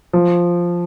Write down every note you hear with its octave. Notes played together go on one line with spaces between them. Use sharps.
F3